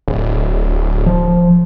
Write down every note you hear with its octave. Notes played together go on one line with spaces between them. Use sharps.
D1
F3